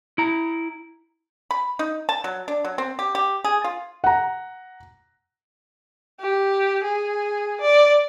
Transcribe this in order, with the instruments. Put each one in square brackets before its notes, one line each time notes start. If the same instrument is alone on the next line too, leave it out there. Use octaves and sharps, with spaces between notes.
[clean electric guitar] E4 A#5
[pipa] B5
D#4
A5
F#3
D4
F#3
C4
G4
G4
G#4
F4
[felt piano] F#5 A#5
[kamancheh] G4
G#4
D5